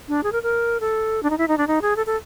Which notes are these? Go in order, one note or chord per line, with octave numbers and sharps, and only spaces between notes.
D4
G#4
A#4
A#4
A4
D4
D#4
E4
D#4
D4
D#4
G#4
A4
A4